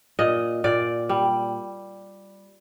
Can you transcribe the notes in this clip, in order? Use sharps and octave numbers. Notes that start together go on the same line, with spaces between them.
A#2 D#5
A#2 D5
G3